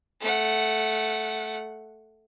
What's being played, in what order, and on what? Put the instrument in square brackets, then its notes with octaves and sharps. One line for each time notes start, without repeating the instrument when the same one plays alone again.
[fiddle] A3 F#5